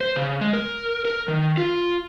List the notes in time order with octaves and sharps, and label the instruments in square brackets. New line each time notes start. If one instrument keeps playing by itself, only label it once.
[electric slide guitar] C5
C#3
G#3
A#4
A#4
D#3
F4